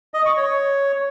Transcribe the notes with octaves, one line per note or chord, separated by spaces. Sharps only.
D#5
C#6
C#5